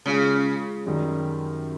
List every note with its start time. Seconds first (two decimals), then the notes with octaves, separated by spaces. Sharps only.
0.06 C#3 G#3 C#4 F4 G#4
0.86 F#2 D#3 G3